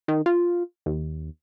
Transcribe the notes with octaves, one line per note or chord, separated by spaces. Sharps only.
D#3
F4
D#2